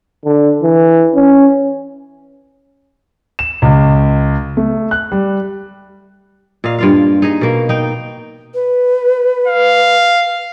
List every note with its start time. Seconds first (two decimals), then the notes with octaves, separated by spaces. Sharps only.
0.25 D3
0.63 E3
1.15 C#4
3.39 E7
3.62 C#2
4.57 A3
4.91 F#6
5.12 G3
6.64 A#2 D#5 F5
6.79 G2 F4 F5
7.22 D#4 G#4 D#5
7.41 B2 A#3
7.69 D#4 G5
8.54 B4
9.48 F5